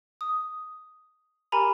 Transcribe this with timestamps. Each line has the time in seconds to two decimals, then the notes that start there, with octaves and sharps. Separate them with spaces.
0.21 D#6
1.52 G4 A#4 G#5 A#5 B5